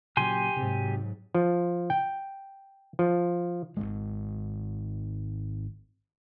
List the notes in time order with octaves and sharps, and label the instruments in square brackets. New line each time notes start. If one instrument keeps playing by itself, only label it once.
[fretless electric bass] A#2 C#3 F#3 [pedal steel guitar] G4 G#5 C6
[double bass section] G#2 F#3 [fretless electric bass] C3
[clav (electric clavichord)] F3
G5
F3
[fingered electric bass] G#1 E2 G#3